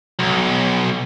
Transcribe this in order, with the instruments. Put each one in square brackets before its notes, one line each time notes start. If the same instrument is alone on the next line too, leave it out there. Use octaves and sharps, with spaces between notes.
[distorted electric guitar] B1